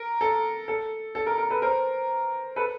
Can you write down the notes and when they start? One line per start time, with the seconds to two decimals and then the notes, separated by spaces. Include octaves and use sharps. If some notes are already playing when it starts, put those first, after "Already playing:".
Already playing: A#4
0.21 A4
0.68 A4
1.15 A4
1.26 A#4
1.38 A#4
1.50 A4 B4
1.62 A#4 C5
2.56 A4 B4